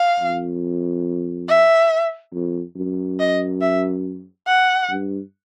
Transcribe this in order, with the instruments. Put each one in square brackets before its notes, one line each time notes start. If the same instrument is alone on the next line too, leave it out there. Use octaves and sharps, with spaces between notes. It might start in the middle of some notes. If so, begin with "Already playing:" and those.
Already playing: [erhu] F5
[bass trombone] F2
[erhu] E5
[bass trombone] F2
F#2
[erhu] D#5
E5
F#5
[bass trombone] G2